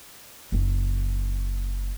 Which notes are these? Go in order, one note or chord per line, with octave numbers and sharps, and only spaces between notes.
F#1 D#4